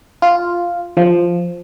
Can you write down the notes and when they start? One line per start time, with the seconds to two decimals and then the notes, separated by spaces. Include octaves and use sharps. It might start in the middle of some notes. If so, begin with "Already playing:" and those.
0.22 F4
0.97 F3